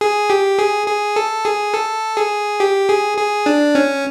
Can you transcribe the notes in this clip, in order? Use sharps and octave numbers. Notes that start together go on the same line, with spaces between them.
G#4
G4
G#4
G#4
A4
G#4
A4
G#4
G4
G#4
G#4
D4
C#4